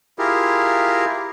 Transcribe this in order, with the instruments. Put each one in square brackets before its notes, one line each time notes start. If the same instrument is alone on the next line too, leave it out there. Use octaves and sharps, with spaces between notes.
[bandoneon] E4 F4 G4 G#4 A#4